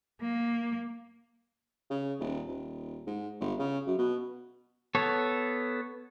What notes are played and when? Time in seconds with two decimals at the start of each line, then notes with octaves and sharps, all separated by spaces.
0.21 A#3
1.90 C#3
2.19 D#1
2.47 D#1
3.07 G#2
3.41 G1
3.59 C#3
3.87 F#2
3.98 B2
4.95 B3 A4 C#5